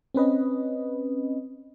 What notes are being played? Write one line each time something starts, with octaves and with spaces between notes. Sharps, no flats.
C4 C#4 B4 D#5